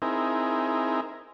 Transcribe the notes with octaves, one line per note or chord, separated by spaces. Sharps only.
C4 D#4 E4 G#4 A#4